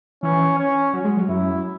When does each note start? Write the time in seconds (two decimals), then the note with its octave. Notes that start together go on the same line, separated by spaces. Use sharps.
0.23 E3 C#4
0.59 C#4
0.94 F#3
1.05 G#3
1.17 F#3
1.29 F#2 E4